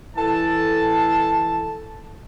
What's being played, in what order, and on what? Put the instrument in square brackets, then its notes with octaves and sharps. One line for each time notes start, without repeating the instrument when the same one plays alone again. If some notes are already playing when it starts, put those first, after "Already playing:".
[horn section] E3 A4 A5